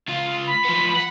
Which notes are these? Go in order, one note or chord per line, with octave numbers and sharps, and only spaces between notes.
C#2 F4
B5
F3 B3
F#5